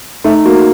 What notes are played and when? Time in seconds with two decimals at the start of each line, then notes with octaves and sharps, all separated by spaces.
0.24 A3 D#4
0.45 A#3 F#4